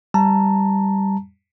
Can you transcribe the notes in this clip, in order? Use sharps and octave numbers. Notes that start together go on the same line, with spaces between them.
G3 A5 A#5